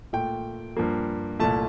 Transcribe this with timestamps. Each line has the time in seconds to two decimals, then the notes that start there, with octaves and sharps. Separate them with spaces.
0.13 A#2 A3 G5
0.77 G2 F3 A#3
1.40 C2 A#2 A3 A5